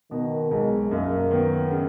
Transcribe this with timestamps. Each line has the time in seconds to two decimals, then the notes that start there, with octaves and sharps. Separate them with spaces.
0.11 B2 D#3
0.51 B1 G#3
0.91 F#2 A#3
1.31 D#3 B3
1.70 C#3